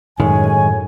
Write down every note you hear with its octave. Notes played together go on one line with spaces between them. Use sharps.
F#2 A2 D#3 G#3 C#5 G#5